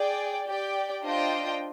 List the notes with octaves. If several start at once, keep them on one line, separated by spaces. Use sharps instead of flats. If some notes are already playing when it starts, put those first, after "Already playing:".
Already playing: G#4 D5 G5
G4 D5 G5
D4 F4 C5 D#5 G5